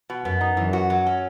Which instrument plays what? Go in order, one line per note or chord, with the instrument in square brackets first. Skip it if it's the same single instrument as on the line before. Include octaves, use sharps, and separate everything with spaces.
[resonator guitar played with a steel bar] B2
[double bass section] F#2 [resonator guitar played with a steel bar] B3
[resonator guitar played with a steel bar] D#4
[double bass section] F#2 [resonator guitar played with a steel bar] E3
[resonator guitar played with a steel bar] F#4
F#3
C#4